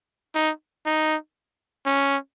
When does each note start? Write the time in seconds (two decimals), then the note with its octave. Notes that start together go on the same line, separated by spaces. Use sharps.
0.35 D#4
0.86 D#4
1.86 C#4